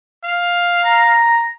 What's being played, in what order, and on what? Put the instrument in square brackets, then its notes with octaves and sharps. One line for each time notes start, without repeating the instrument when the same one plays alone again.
[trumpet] F5
[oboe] A#5